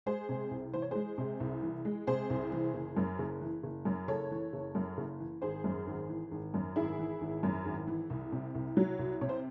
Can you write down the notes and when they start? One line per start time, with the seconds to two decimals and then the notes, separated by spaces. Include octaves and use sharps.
0.06 G#3 G#4 C5
0.29 C3
0.51 C2
0.74 E3 C5
0.82 C#5
0.91 G#3 G#4 C5
1.18 C3
1.40 C2
1.63 E3
1.85 G#3
2.07 C3 G#4 C5
2.30 C2
2.52 E3
2.74 F#1
2.97 F#2
3.19 F#1
3.41 E3
3.63 F#1
3.85 F#2
4.08 F#1 A4 C#5
4.31 E3
4.53 F#1
4.75 F#2
4.98 F#1
5.20 E3
5.42 G#1 G#4 C5
5.64 F#2
5.87 G#1
6.09 E3
6.32 G#1
6.54 F#2
6.76 G#1 E4 G#4
6.99 E3
7.21 G#1
7.43 F#2
7.66 G#1
7.87 E3
8.10 C2
8.32 C3
8.55 C2
8.77 F#3
8.99 C2
9.21 C3 C#5
9.29 C5